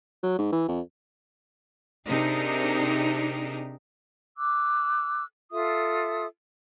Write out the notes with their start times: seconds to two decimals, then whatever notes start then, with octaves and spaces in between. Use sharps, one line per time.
0.23 F#3
0.38 G#2
0.52 E3
0.68 F2
2.07 C3 D4 D#4 G4 G#4 A#4
4.37 D6 E6 F#6
5.51 F4 A4 E5 D#6